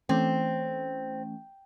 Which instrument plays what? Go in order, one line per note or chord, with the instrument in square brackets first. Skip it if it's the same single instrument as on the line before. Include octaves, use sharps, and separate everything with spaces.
[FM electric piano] E3 A3 C#4 [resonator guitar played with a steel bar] C4